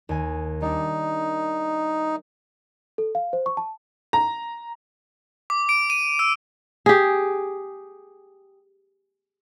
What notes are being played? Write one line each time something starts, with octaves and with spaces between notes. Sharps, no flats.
D#2 G#5
G3 D4 D#4
A4
F5
C5
C#6
A5
A#5
D6
D7
D#7
E6
G4 G#4